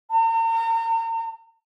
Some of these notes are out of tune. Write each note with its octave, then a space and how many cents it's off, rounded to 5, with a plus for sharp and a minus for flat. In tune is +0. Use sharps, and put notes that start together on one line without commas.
A#5 -40